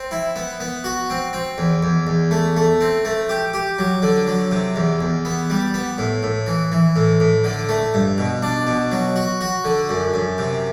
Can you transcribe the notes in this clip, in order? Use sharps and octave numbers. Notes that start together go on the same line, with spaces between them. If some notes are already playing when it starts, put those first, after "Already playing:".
Already playing: C4
E4
B3
B3
F#4
C4
C4
E2
E2
E2
A3
A3
C4
A3
G4
G4
F#3
D3
F#3
C3
E2
E2
B3
G3
B3
A2
A2
E3
E3
A2
A2
D3
A3
G2
B2
D4
B2
F#3
F#4
F#4
D3
F#2
F#2
C3